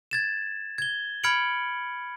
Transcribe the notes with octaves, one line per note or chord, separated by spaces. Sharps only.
G#6 A6 E7
G#6 G7
B5 F6 G#6 C#7 D7 F#7